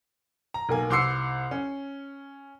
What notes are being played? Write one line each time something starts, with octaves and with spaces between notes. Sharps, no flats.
A#5
B1 A#3 G#5
C2 C6 D6 E6 C7 C#7
C#4